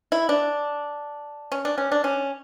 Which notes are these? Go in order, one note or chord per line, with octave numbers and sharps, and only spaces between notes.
E4
D4
C#4
D4
C#4
D4
C#4